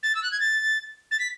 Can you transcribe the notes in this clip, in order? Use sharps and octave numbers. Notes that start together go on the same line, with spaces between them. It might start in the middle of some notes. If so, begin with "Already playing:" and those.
A6
E6
F#6
G#6
A6
A6
B6